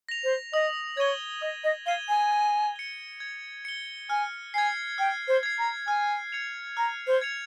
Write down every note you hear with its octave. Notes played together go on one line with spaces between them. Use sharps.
A#6 F7
C5
D#5 D#6
C#5 G#6 D#7 G7
D#5 D#6
D#5
F5 G#6 D#7 G7
G#5
G#6
C#7 G7
G#6
C#7 G7
G#5 F6
G#5 G#6 C7
G5 F6
C5
G#6 C7
A#5
G#5 F6
G#6 C#7 F7
A#5 F6
C5
G#6 C#7 F7